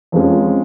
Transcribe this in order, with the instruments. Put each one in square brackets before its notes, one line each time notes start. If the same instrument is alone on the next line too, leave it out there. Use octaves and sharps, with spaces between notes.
[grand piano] F2 F3 G#3 C#4